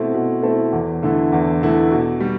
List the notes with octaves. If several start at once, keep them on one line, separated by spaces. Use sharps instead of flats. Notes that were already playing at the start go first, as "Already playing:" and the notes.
Already playing: B2 A3 C4 E4 A4
B2
A3 C4 E4 A4
E2
D3 A3 E4 A4
E2
D3 A3 E4 A4
B2
G3